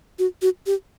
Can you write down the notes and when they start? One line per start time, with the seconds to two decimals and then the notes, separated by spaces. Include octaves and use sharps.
0.19 F#4
0.42 F#4
0.66 G4